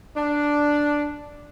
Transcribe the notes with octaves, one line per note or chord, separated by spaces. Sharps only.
D4